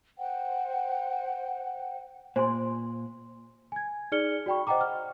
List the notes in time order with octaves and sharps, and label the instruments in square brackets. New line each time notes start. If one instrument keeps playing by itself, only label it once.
[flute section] C5 F#5 G5
[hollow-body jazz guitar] A#2 [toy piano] C5 G#5 C6
[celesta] G#5 G#6
D#4 G#4 D5 F6 C#7 G7
F#4 D5 G5 B5 C#6
C5 D#5 F#5 G5 A#5 D6
F6